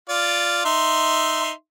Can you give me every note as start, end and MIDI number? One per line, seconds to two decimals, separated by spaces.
0.09 0.63 65
0.09 0.63 74
0.65 1.51 63
0.65 1.51 76
0.65 1.51 84